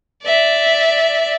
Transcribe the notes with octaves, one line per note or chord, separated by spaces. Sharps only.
D5 E5